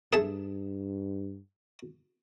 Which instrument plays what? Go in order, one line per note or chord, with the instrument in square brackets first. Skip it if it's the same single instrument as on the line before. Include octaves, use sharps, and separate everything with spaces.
[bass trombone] G2 [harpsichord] G#4 A4 E5